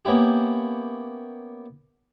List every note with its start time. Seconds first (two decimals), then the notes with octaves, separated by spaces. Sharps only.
0.05 A#3 B3 C#4 E4 G4